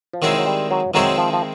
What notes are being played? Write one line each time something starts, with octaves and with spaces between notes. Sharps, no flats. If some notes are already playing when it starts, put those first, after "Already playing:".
F3
D#3 F#3 G#3 C4 E4 G#4
F#3
G3
F#3
D#3 F#3 G#3 C4 E4 G#4
F3
F3